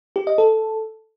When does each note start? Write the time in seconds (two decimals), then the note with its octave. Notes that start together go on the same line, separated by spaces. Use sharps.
0.16 G4
0.27 D#5
0.38 A4